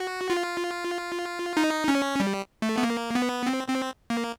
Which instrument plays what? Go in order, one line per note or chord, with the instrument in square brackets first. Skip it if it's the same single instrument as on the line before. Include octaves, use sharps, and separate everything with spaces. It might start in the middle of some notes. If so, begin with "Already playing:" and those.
Already playing: [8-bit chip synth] F#4
F4
D#4
C#4
G3
A3
B3
A#3
B3
C4
C4
A#3